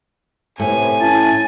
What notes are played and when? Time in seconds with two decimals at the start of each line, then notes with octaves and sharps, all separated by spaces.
0.60 A2 C3 B3 C4 G#5
1.01 C#4 E4 A5